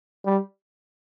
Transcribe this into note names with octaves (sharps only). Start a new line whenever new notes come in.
G3